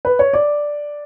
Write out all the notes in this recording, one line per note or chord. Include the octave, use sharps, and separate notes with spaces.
B4
C#5
D5